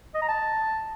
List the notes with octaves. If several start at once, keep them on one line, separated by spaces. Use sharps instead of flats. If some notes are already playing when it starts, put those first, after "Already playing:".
D#5
A#5
A5